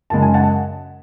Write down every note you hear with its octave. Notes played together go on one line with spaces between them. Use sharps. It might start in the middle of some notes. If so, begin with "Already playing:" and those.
F#2 C#3 G#3 A5
G#5
F#5 A5